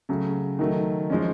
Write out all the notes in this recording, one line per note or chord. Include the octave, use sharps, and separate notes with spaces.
C#3 F#3 A3
D#3 F#3 A3
F3 G#3 C#4